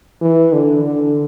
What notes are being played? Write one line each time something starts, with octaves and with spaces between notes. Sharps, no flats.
E3
D3
D3